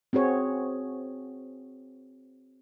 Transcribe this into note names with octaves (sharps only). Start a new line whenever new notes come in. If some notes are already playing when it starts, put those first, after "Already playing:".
C4 F#4 G#4 C#5